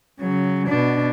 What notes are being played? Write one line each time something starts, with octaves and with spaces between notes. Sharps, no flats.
C#3 F#3
B2 D4